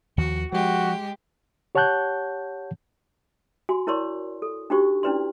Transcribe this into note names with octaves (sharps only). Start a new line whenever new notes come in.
D#2 D#3 F3 F#4
F3 G#3 F#4 G4
G4 C#5 F#5 A5 F#6 G6
F#4 G#5 C6
E4 A#4 C#5 D5 C6 C#6
A4
D4 D#4 F#4 G4 C5 C#6
C#4 D4 E4 B4 D5 C6